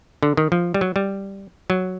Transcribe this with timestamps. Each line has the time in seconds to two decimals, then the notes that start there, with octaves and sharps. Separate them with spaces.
0.23 D3
0.37 D#3
0.52 F3
0.74 G3
0.81 F#3
0.96 G3
1.70 F#3